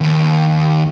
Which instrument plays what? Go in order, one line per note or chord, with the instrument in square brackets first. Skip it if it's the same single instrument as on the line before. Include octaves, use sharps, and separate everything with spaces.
[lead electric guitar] D#2